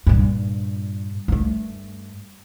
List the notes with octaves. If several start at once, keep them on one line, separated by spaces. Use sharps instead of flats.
G2 A#2
G2 A3